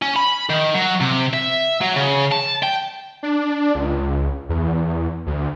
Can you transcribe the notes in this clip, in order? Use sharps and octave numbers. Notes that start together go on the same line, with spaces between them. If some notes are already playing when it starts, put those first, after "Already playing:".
C#4
B5
D#3
F#3
C3
E5
F#3
C#3
A5
G5
D4
C#2
E2
D2